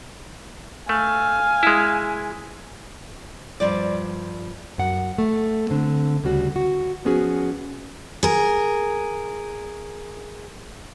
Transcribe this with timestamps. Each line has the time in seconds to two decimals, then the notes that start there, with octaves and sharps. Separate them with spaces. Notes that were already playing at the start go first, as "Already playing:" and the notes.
0.89 A3 F5 G#5
1.63 G#3 E4
3.60 G2 F3 D5
4.78 F#2 F#5
5.18 A3
5.70 D3 C4
6.24 D2 C#3 G3 F#4
6.56 F#4
7.05 F3 B3 C#4 F#4 G#4
8.23 G#4 A#4